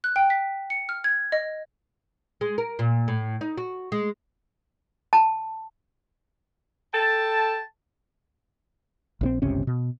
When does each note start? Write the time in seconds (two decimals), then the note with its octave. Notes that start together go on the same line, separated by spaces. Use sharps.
0.04 F#6
0.16 G5
0.30 B6
0.70 C#7
0.89 F6
1.04 G#6
1.32 D#5
2.41 G#3
2.58 A#4
2.79 A#2
3.08 A2
3.41 D#4
3.58 F#4
3.92 G#3
5.13 A5
6.94 A4 G5 A5
9.21 A#1 C#3 C4
9.42 G1 C#2 C3 C#4
9.67 B2